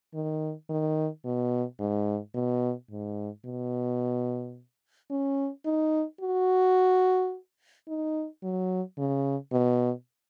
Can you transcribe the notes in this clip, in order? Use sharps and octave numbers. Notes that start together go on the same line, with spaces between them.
D#3
D#3
B2
G#2
B2
G#2
B2
C#4
D#4
F#4
D#4
F#3
C#3
B2